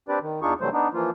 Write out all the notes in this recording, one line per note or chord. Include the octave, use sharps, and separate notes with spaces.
C4 D4 G4 B4 D5
D#3
E2 D4 D#4 F4 G#4 C#6
C3 E3 F#3 G3 A3 C5
B3 D4 D#4
E3 F3 A#3 F4